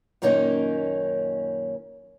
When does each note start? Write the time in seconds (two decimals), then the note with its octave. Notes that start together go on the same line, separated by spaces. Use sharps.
0.22 F#2 A#2 D#3 A#3 C#4 D#4